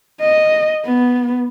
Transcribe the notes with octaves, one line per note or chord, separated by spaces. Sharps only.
D#5
B3